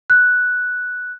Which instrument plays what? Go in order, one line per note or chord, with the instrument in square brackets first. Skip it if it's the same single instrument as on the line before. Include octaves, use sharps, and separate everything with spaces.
[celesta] F#6